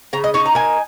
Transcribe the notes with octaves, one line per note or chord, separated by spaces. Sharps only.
C#3 A#5
D#5
D#4 C#5
A#5
A#3 G#5